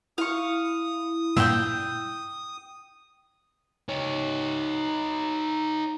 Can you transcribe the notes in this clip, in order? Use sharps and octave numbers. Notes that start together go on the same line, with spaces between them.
E4 F5 C#6 D#6
G2 A#2 G5 E6
D#4 C#5